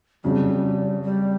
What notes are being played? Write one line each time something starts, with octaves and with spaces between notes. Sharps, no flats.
F2 C#3 F#3 G3
G3